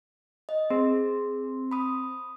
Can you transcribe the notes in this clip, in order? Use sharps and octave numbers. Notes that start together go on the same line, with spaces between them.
D#5
C4 G#4
B5 D#6